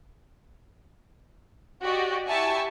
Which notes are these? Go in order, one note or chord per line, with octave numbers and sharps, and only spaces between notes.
F#4 G4 D5 D#5
E4 G4 E5 G#5 A5 C#6